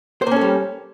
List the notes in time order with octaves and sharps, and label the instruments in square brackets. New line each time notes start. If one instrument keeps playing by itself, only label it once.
[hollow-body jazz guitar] C5
A#3
C#4
A4
G3